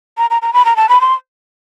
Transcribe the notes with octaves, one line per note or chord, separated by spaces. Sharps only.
A#5
A#5
A#5
B5
A#5
A5
B5
C6